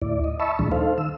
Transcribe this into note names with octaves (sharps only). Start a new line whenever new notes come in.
D2 A2 E4 D5
D#5
D#5 E5 A5 B5 C#6 E6
D2 A#2 E3 F3 G#3 D4
D#4 A4 C5 F5
D#3 E6